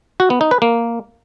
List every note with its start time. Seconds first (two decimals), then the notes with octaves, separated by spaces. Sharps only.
0.20 F#4
0.30 B3
0.41 D#4
0.51 B4
0.62 A#3